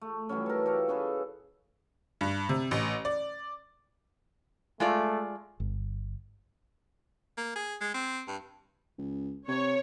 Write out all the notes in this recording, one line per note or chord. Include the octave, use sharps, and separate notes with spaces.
A3
E3 F#3 G3 C#4
A4 A#4
G4 A4 F5
C#4 G#4 A4 B4
G2
C3
A1
D5
G#3 A3 F4 D5
G1
A#3
G#4
G#3
C4
G2
C#2
C3 C#5